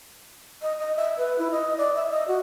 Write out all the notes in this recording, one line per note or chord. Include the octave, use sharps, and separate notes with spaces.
D#5
D#5
E5
B4
E4
D#5
D5
E5
D#5
F#4